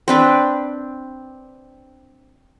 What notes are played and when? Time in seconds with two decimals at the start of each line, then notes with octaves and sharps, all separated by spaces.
0.08 C4 D4 B4